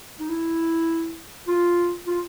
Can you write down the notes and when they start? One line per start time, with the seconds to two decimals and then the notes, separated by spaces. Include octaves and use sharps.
0.20 D#4
0.29 E4
1.47 F4
2.07 F4